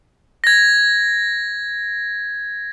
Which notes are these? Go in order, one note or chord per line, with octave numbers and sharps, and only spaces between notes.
G#6 A#6